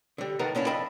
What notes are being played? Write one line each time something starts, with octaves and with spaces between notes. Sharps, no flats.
D3 G3
A2 D#3 A#4 B4 F#5 A#5
A#2 C#4 D4 E4
F2 D4 D#5 E5 G5 B5